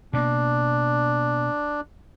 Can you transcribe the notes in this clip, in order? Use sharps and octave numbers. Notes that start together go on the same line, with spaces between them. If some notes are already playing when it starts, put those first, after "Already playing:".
B2 A#3 D4